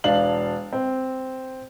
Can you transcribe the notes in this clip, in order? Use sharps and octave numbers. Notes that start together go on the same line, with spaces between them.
E1 D4 F5 F#7
C4